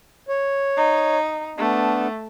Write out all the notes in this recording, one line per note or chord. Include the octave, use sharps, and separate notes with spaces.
C#5
D#4
A3 B3 D4